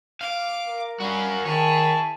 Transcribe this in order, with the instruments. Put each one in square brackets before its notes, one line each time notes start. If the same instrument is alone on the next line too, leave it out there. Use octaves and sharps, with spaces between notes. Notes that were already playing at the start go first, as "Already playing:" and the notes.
[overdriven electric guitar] F5 [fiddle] D6
[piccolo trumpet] A#4
[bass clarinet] G3 [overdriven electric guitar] C#4 F#4 [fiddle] F5
[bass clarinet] D#3 [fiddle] E4 G#4 [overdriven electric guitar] C#5 [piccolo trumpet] A5